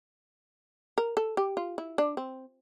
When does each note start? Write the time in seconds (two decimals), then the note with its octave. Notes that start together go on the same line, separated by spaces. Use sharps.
0.98 A#4
1.17 A4
1.37 G4
1.57 F4
1.78 E4
1.98 D4
2.17 C4